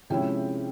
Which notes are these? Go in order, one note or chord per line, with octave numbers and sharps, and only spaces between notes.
C3 F3 G#3 C#4 E4 G5